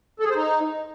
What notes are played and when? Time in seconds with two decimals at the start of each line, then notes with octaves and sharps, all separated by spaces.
0.20 A4
0.25 G#4
0.30 C5
0.36 D#4